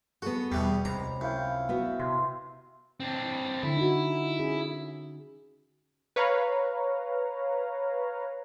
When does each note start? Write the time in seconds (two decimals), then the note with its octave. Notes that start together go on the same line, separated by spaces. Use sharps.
0.22 B3 F#4 G#4 A4
0.52 E2 B2 E3 G3
0.85 C#2 C3 D5 A#5 B5
1.21 F#2 E4 F5 G5
1.69 B3 F#4 E5
1.99 C3 C6
3.00 C4 D4
3.63 D3 E4
3.77 D#4 F#4
4.39 C#4 G#4
6.16 B4 C#5 F5 A#5